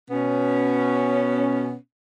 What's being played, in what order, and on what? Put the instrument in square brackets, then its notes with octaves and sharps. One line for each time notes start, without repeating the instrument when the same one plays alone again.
[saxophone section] B2 B3 C#4